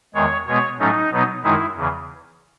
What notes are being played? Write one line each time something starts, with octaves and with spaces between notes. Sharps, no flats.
E2 D#3 G#3 C#5
B2 G#3 B3 C#5
A2 F#3 A3 C#4 D#4
B2 F#3 B3 D#4
F#2 D#3 G#3 D#4 E4
E2 C#3 E3